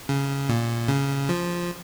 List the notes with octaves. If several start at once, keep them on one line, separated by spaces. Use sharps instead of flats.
C#3
A#2
C#3
F3